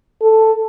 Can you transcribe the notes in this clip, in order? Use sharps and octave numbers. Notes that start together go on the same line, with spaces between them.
A4